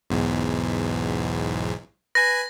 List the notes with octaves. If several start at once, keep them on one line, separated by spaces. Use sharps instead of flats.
B1 E2 G#2
B4 G#5 A#6